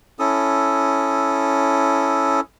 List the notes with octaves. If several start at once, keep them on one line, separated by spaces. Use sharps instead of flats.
C#4 E4 A4 D#6